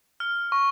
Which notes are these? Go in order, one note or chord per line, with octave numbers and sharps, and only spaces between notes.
F6
C#6